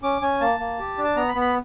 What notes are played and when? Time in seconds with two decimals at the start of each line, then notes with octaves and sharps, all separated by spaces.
0.03 C#4 D6
0.22 C#4 G#5
0.41 A#3 A5
0.59 A#3
0.79 G4
0.98 D4
1.04 A5
1.16 B3 A#5
1.28 B5
1.35 B3
1.41 B5